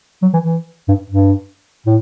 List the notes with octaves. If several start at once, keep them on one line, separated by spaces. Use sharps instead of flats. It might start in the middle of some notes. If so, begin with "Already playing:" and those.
F#3
E3
E3
G2
G2
A2